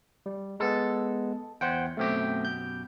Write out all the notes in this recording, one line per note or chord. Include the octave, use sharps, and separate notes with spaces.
G3
G#3 B3 A4
E2 C5 F#5 G5
F#2 B2 A3 C4 G4
G6